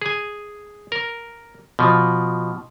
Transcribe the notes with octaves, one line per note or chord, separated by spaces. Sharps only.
G#4 G#5
A#4
B2 F3